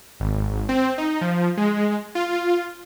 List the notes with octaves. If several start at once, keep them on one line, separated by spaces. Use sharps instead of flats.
G#1
C4
D#4
F3
G#3
F4